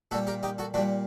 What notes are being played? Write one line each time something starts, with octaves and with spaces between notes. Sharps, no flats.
A#2 G3 F#4 A4
G4 A#4
D#4 G4
F#4 A4
A#2 G3 D4 F#4